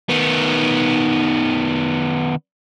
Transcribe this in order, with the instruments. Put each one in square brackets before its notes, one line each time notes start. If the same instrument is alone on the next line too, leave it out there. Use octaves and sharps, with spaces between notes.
[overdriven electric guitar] D#3 B3